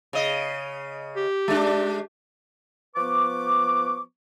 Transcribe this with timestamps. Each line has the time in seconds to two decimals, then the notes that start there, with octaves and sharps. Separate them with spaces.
0.13 C#3 D#5
1.16 G4
1.48 G#3 D4
2.96 F3 B3 B4 C#6 D6